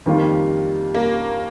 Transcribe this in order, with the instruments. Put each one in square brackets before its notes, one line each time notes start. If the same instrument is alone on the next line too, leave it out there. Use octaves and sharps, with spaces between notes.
[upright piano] F2 D#3 G3 A#3 F4
[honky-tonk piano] A#3